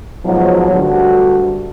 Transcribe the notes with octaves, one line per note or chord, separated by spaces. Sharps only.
G#2 B2 F3 F#3
D2 G2 D3 F#4